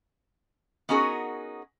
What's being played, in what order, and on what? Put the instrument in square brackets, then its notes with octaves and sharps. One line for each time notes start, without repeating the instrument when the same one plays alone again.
[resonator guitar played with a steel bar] B3 C#4 D#4 F#4 G#4 A#4